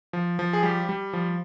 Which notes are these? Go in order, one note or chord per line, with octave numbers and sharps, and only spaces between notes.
F3
F3
G#4
G3 G4
G3
F3